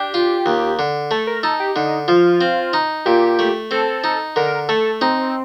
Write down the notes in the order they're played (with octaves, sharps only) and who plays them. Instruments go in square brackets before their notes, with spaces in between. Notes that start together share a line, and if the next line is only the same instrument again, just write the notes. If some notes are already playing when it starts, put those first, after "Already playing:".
Already playing: [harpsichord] D4 [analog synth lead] G4
[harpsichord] F4
D#2
D3
[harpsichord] A3 [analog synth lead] A4
[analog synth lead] A#4
[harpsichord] D#4 [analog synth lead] A4
[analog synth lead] G4
[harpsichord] D3 [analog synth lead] D#4
[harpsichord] F3 [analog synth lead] F4
[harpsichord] C4
D#4
[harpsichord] A#2 [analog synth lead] G4
[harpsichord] A3
[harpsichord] C4 [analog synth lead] A4
[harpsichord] D#4
[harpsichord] D3 [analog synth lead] A#4
[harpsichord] A3 [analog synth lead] A4
[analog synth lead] C4 [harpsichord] D#4